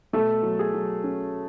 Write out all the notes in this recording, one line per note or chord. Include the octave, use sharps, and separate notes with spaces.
B2 A3 A4
F#3
G#4
F#3
C#4